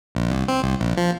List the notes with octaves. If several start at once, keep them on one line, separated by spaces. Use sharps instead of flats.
A#1
C2
C4
C2
A#1
F3